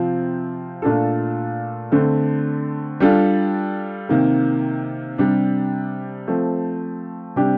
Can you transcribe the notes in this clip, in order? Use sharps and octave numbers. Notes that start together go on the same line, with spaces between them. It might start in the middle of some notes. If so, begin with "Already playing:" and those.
Already playing: C3 F3 C4 F4
A#2 A3 D4 F4 A4
D3 A3 C4
G3 D4 F4 A4
C3 D#3 A#3
C3 G3 D4
F3 A3 C4
C3 G3 D4 G4